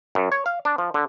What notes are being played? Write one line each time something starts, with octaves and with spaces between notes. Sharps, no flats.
F#2
C#5
F5
D4
F3
D3